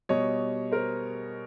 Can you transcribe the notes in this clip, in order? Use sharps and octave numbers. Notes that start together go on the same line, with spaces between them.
B2 G3 C#5 D#5
A#4 C5